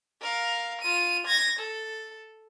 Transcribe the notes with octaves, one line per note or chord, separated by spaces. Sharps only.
A#4 F5
F4 D#7
G#6 A#6
A4